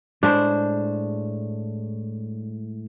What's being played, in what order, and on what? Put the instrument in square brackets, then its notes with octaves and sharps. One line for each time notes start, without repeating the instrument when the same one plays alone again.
[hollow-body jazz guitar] A2 G#3 C5 [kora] D4